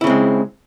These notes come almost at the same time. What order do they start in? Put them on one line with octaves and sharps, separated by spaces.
E4 C#3 C4 G#3